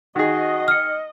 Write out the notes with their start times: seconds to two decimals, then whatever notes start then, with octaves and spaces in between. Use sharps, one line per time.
0.16 D#3 F#4 G#4 D#5
0.68 F6 C#7